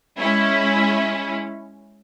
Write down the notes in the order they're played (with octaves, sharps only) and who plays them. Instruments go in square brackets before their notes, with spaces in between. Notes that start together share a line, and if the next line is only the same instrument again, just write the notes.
[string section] G#3 C#4 E4